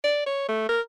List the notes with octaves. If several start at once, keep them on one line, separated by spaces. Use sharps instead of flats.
D5
C#5
A3
A#4